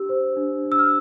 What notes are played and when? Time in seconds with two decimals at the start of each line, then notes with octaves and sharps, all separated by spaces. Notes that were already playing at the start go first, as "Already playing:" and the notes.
Already playing: D4 G4 E6
0.09 C5
0.37 D4
0.65 D4
0.72 E6
0.79 F6